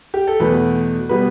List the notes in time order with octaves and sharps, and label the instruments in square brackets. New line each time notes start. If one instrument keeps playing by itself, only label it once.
[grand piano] G4
A4
E2 B2 A3 B4
B2 G3 B3 B4